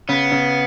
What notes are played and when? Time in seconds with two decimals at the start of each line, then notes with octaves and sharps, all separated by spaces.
0.09 C#3 B3
0.32 C#3